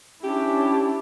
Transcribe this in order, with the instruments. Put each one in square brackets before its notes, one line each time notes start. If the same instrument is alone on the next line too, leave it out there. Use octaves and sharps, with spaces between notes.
[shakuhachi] C#4 [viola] D4 E4 [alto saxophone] G4